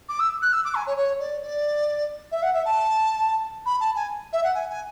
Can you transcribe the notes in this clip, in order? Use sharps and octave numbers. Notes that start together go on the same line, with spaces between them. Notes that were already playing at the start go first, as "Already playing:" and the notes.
D6
E6
F#6
E6
D6
G#5
C#5
C#5
D5
D5
E5
F#5
E5
A5
B5
A5
G#5
E5
F#5
G#5
G#5